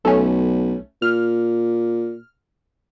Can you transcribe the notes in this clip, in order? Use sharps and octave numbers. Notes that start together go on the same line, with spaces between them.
B1 A3 C#4
A#2 F6